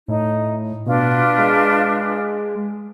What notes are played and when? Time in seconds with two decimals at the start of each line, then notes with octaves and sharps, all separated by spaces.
0.08 A2 D#4
0.86 B2 D4 F4 B4
1.38 G#3